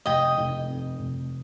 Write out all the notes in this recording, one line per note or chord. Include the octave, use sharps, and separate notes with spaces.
F1 D#5 G5
F1
F2
F1